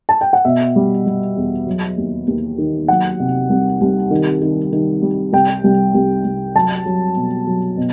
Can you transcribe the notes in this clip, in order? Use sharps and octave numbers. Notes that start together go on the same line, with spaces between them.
A5
G5
F#5
B2 E5
G3
G3
E2
F#3
D#2
D#2
D#3
F#3 F#5
C3
C2
C2
D#3
D#3
D#3
G3
C2 G5
C2
C2
C2
F#3 A5
F#3
B2
F#3
B2